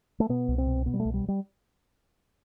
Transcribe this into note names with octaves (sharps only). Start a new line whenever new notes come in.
A3
B2 B3
C2
C4
B2
B2 B3
G3
A3
C2
G3
G3